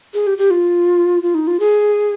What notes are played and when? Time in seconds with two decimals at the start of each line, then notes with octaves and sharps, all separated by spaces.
0.14 G#4
0.27 G4
0.38 G4
0.50 F4
1.22 F4
1.34 D#4
1.47 F4
1.60 G#4